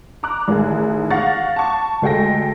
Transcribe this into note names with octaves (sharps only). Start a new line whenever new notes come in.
A#5 D6 F#6
A1 D#3 G#4
F5 F#5 C#6 A6 A#6
A5 C#6
D2 G#3 A4 G5 A#6